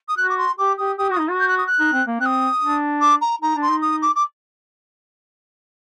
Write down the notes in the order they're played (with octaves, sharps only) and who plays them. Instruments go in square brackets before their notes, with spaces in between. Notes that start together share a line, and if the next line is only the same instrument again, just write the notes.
[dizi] D#6
[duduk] F#4 [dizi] F#6
[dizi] D6
C6
[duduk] G4 [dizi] D6
[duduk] G4 [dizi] D#6
[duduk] G4 [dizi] D#6
[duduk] F#4 [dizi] D#6
[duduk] D#4
F#4
[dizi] G6
F#6
D#6
F#6
[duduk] D#4
C4
A#3
[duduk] C4 [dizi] F#6
[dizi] D#6
[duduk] D4
[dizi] D6
A#5
[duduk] D#4 [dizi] A#5
[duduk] D4
[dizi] C6
[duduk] D#4
[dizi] D#6
D6
D6